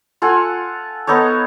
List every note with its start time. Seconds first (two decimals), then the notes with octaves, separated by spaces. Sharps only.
0.22 F4 A4 F#5 G#5
1.07 B3 D#4 A4 C#5